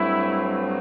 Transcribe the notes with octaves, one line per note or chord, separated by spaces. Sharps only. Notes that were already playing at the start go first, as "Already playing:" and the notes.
Already playing: G2 F#3 A3 C4 E4